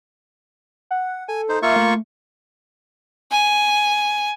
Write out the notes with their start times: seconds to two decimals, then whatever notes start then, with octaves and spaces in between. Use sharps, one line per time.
0.91 F#5
1.28 A4 G#5
1.49 D#4 C5
1.62 A#3 F4 E5 C#6
1.76 A3
3.31 G#5